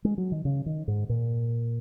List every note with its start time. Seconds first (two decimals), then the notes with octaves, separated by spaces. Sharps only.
0.05 G#3
0.18 F#3
0.32 D#3
0.45 C#3
0.66 D#3
0.88 G#2
1.09 A#2